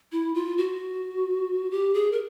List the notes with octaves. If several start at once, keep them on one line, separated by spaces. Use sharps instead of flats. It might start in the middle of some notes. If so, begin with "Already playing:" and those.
E4
F4
F#4
G4
G#4
A#4